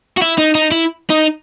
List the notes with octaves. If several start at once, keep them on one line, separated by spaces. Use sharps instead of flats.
F#4
E4
D#4
D#4
E4
D#4